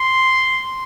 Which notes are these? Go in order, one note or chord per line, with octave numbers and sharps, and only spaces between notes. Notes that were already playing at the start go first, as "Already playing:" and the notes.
Already playing: C6